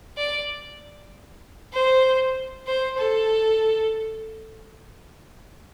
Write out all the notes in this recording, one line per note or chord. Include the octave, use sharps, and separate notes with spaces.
D5
C5
C5
A4